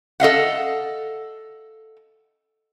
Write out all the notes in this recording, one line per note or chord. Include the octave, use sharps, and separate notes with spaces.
A4 D#5 F5 F#5